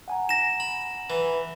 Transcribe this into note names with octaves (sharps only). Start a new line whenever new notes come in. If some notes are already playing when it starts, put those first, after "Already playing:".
F#5 G#5 A#5
A#6 E7
B5
E3